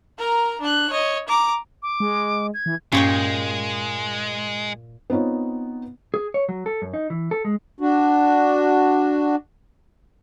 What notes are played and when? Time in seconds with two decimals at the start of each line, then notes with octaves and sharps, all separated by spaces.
0.18 A#4 A#5
0.61 D4 F#6
0.90 C#5 D#5
1.28 A#5 D6
1.82 D6
2.00 G#3
2.54 G#6
2.66 E3
2.92 G2 A#2 G#3 C#4 C#5 G5
5.10 B3 C4 D#4 F4 C#5
6.14 G#4
6.34 C#5
6.49 F#3
6.66 A4
6.82 F#2
6.94 D#4
7.10 E3
7.31 A4
7.45 G#3
7.80 D4 F#4